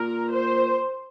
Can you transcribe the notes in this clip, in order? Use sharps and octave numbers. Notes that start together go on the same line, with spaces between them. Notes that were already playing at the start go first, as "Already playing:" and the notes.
Already playing: A#2 A#4
C5